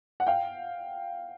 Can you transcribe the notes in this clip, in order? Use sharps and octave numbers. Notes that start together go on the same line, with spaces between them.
F#5
F5 G5